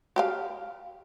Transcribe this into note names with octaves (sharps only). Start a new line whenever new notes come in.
F#4 G4 F5